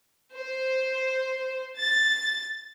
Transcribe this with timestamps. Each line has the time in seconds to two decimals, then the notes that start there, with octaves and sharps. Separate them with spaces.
0.35 C5
1.78 A6